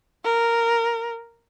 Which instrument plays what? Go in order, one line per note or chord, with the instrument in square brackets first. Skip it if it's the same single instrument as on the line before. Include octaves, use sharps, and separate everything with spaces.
[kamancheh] A#4